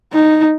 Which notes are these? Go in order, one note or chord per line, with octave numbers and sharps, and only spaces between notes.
D#4